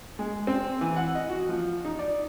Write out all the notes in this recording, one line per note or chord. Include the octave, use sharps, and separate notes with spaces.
G#3
C4
E3
F#5
D#5
F#4
F3
D#4
D5